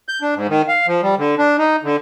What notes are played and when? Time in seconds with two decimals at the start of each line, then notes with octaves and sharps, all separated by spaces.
0.09 G6
0.22 D4
0.35 G#2
0.49 D#3
0.68 F5
0.87 F3
1.02 G3
1.18 D3
1.38 D4
1.58 D#4
1.83 D3